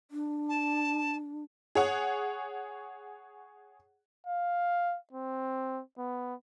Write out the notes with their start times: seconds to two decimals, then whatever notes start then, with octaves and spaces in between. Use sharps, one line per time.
0.11 D4
0.49 A5
1.75 G#4 C#5 F#5
4.27 F5
5.13 C4
5.98 B3